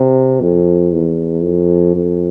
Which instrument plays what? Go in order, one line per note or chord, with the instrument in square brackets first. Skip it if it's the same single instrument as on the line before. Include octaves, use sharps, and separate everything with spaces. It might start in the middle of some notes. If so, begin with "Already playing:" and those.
Already playing: [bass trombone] C3
F2
E2
F2
F2